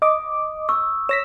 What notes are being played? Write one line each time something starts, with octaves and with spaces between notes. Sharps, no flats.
D#5 D6 D#6
C#6 E6
C#5 A#6 B6 E7